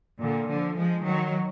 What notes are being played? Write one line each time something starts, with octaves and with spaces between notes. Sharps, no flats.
A#2 D3
D3 F3
F3 G#3
D#3 F#3